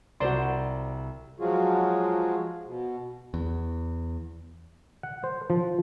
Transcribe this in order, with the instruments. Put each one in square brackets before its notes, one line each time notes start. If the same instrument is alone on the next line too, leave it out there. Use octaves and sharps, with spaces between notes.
[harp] C2 A#5 E7 [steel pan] F#4 C5 C6 [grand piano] D5
[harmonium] F3 F#3 G#3 F4 F#4 G#4
B2
[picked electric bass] E2
[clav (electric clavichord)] F#5
C5
F3